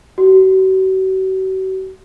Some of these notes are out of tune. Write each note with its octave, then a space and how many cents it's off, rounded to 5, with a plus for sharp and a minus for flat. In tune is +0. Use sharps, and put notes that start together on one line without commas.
F#4 +40